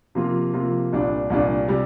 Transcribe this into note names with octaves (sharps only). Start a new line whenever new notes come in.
C3 F3 A#3 F4
C3 F3 A#3 F4
C2 A#2 G3 D4
C2 A#2 G3 D4
C3 G3